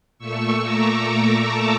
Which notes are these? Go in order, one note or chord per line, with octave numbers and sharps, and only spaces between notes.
A#2 A3 C#6 E6
A#5 D6
A#5 D6
A5 C#6